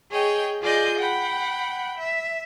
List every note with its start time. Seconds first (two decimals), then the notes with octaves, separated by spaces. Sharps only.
0.11 G#4 C#5 D#5 G5
0.61 F4 G#4 D5 D#5 G6
0.98 F#5 G5 B5
1.98 E5